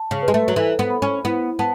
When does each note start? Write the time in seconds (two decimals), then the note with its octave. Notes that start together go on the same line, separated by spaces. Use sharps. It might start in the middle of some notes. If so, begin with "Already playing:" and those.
Already playing: A5
0.11 C#3
0.22 B4
0.28 G#3
0.34 A3
0.48 F#3
0.56 E3 A4
0.79 B3
0.90 B5
1.02 C#4
1.25 B3 E4
1.59 B3 A5